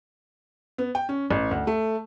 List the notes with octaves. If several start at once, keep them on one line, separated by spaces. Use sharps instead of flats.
B3
G5
C#4
A1
D2
A3